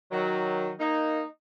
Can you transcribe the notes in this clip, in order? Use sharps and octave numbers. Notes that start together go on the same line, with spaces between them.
D#3 F#3
A#3 D#4